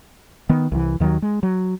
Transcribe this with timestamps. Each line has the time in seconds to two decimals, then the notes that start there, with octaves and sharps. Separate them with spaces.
0.49 D#3 B3
0.72 C2 E3
1.00 D#2 D#3 F3 F#3
1.22 G#3
1.43 F#3